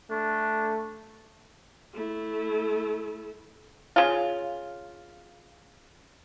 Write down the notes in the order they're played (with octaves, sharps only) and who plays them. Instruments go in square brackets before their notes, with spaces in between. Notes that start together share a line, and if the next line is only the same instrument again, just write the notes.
[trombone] A3 [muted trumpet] D4
[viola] A3 E4
[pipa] C#3 F4